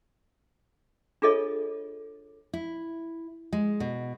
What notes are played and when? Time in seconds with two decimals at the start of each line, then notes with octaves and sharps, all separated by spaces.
1.22 D4 F4 G#4 A4 C#5 D#5
2.53 E4
3.53 G#3
3.80 B2